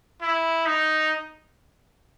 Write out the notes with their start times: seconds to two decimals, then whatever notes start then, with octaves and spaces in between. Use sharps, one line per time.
0.22 E4
0.66 D#4